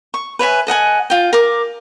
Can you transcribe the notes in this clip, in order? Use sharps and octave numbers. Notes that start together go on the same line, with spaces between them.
C#6
B4 C#5 E5 G#5
A4 D#5 F#5 G#5
F4 G5
A#4 D6